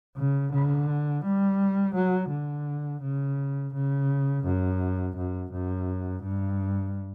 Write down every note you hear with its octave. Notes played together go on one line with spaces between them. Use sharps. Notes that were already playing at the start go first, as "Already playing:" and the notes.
C#3
D3
G3
F#3
D3
C#3
C#3
F#2
F#2
F#2
G2